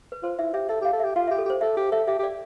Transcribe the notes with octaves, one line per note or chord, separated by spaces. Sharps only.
B4
F4 C5
E4 E5
G4 E5
A4 E5
G4
F5
A4
G4 E5
F4 F5
E5
G4
A4
G4 C5
A4 E5
G4
A4 E5
G4 E5
G4
D5